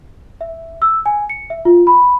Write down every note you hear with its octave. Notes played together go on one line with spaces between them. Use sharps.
E5
E6
G#5
C#7
E5
F4
B5